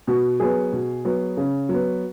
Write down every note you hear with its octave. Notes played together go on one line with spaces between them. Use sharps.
B2 F#4
F#3 B3 G#4
B2
F#3 B3
C#3
F#3 B3